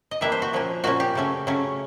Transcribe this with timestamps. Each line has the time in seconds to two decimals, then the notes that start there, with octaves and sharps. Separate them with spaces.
0.11 D#5
0.21 E3 G3 A#3 D4 E5
0.32 C5
0.42 F#4
0.53 A#2 F3 A#3 C#4
0.84 A#2 F3 A#3 C#4 F#4
1.00 G4
1.15 C#3 F#3 A3 C#4
1.47 C#3 F#3 A3 C#4